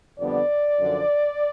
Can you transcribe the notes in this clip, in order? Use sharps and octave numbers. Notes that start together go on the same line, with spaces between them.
F2 D3 G3 B3 D5
F#2 D3 F3